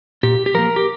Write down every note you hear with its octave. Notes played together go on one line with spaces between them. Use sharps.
A#2 G4
G4
F3 A#3 A#4
G4